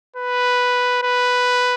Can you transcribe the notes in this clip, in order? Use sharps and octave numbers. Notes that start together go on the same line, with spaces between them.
B4
B4